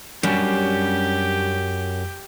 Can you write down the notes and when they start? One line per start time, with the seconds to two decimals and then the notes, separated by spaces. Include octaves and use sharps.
0.23 F#2 G3 C#4 D4 G4